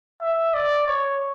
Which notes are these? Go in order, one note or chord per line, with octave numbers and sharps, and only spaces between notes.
E5
D5
C#5